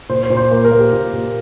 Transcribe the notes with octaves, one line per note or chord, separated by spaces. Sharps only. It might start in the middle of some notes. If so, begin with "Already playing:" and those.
A#2 C5
C5
A#2
C5
A#3 C5
A#4
A#3
G4
A#2
A#2